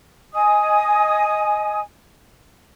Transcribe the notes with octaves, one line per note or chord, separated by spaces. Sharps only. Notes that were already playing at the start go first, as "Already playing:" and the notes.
D#5 G#5 D#6